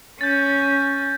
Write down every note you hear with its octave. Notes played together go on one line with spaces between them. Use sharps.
C#4 G6 A6